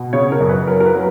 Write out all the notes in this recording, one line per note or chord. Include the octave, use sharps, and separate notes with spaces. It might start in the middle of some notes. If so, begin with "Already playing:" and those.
Already playing: B2
C#3 C#5
A#4
F#2
B4
F#3 A#4
A#4
B4
F#3